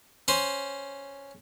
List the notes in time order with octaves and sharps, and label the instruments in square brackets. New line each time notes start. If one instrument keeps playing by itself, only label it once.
[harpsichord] C#4 C5